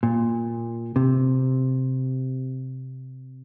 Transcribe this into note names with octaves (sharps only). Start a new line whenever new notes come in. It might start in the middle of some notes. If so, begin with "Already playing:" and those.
A#2
C3